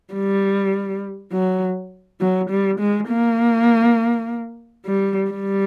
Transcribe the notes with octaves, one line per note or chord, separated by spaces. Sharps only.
G3
F#3
F#3
G3
G#3
A#3
G3
G3